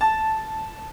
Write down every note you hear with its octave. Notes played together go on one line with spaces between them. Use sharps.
A5